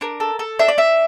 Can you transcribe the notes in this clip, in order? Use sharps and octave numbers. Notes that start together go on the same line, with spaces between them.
D4 A#4
A4
A4
D4 E5
D5
D4 E5